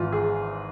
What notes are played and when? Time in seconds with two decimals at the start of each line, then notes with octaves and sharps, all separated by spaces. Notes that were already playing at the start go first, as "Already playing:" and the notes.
Already playing: G#1 G#2 E3 F4
0.12 G#4